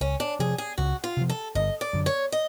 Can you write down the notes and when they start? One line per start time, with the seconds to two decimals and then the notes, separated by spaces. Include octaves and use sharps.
0.01 C#2 C#4
0.20 D4
0.39 C3 F3 G#4
0.58 G#4
0.78 C#2 F#4
1.04 F4
1.17 C3 F3
1.30 A4
1.55 G1 D#5
1.81 D5
1.93 F#2 D3
2.06 C#5
2.32 D#5